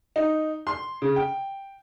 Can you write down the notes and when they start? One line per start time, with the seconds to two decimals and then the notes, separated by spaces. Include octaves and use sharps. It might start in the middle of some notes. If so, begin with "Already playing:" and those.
0.16 D#4
0.67 C6
1.02 C#3
1.16 G5